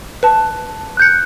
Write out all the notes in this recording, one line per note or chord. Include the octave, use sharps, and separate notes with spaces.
B4 A5
F#6 G6 C#7